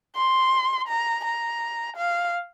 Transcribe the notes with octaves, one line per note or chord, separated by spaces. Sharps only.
C6
A#5
A#5
F5